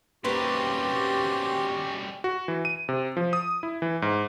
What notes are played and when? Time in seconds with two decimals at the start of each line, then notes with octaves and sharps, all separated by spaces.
0.24 G3 A#3 C4 C#4 F#4 G4 B4 C6
2.24 F#4
2.48 E3
2.65 D#7
2.89 C3
3.17 F3
3.33 D#6
3.63 E4
3.82 E3
4.02 G#2